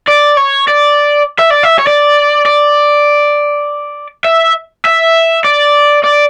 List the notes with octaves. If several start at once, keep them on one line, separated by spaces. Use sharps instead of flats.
D5
C#5
D5
E5
D5
E5
C#5
D5
D5
E5
E5
D5
D5